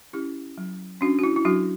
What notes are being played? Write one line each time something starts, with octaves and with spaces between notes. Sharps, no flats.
C#4 E4 G4
F#3
C#4 D4 F#4
F#4
E4
E4
F#3 D4 F#4